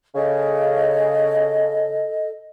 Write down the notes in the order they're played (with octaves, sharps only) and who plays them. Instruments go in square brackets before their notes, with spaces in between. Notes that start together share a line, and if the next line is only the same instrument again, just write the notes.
[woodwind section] C#3 [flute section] A4 D#5